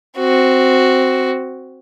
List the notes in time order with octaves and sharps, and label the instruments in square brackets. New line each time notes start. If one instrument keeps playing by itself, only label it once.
[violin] C4 F#4